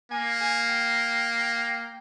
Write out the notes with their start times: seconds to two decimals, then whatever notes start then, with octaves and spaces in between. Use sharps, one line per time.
0.12 A#3 G#5
0.41 G#5
0.70 G5